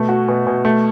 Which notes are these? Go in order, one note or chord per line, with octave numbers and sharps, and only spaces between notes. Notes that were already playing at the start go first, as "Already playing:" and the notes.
Already playing: B2 A3
F#4
B2
B2
A3